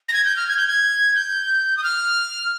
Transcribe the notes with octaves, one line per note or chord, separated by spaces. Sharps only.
A#6
G#6
G6
F6
G#6
G6
G#6
G6
D#6
F6